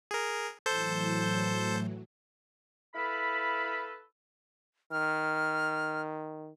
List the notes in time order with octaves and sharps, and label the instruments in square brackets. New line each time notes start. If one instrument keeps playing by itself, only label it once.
[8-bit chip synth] G#4 A#4
[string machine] A2 E3 F#3 [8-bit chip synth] A4 C5 G6
[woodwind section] E4 A4 B4 F5 B5
[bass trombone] D#3 [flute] F6